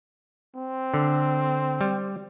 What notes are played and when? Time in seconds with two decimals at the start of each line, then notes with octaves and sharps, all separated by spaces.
0.55 C4
0.94 D3
1.81 G3